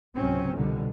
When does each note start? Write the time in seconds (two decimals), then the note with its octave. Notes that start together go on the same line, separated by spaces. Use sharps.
0.16 C#2 G#2 C3 F#3 C4 C#4
0.56 C2 F2 B2 D3 D#3 G3